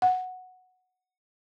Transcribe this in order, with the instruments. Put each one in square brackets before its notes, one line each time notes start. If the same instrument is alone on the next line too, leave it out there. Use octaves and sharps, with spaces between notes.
[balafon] F#5